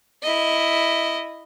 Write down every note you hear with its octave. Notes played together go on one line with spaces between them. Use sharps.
E4 D#5